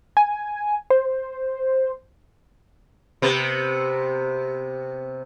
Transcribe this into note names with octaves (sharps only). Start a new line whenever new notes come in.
G#5
C5
C3 B3